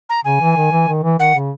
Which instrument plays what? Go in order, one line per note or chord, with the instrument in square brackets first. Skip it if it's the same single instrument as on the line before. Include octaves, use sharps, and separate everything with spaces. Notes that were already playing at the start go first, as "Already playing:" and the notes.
[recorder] A#5
[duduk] C#3 [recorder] G#5
[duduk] E3
D#3
E3
D#3
E3
[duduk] D#3 [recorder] F#5
[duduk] C#3